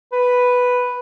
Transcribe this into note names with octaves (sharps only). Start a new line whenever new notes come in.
B4